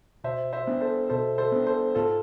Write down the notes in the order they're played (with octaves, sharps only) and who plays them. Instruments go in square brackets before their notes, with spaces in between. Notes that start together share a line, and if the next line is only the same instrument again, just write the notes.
[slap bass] B2 [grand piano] C5 E5
[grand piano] C5 E5
[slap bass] B3 D4
[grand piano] A4 C5
[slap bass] B2 [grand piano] A4 C5
[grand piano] A4 C5
[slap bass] B3 D4
[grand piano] A4 C5
[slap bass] G#2 [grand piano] F4 A4